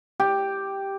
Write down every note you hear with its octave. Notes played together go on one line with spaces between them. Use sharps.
G4